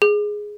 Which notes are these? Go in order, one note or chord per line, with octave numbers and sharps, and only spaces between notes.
G#4